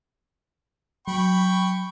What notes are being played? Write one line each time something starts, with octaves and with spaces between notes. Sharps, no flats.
F#3 G5 B5 C#6